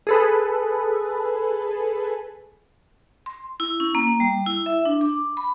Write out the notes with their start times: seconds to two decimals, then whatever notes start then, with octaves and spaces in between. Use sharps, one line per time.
0.07 G#4 A4 B4
3.26 C6
3.60 E4
3.80 C#4
3.95 A#3
4.20 G3
4.46 E4
4.66 E5
4.85 D4
5.01 D6
5.37 B5